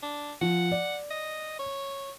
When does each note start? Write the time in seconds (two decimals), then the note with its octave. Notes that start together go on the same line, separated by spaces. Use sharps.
0.02 D4
0.41 F3 F#5
0.72 D5
1.11 D#5
1.59 C#5